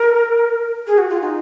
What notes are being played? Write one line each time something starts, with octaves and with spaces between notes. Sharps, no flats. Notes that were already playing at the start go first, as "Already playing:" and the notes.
Already playing: A#4
G#4
F#4
F4
D#4